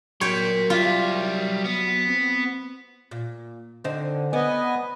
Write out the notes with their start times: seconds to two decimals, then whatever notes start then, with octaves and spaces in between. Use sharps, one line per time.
0.21 F#3 A#4 C#5 G5 C6
0.70 G3 F4 E5
1.65 B3
2.08 C4
3.11 A#2
3.84 D3 C4 D#4
4.33 B3 B4 D5 D#5 G#5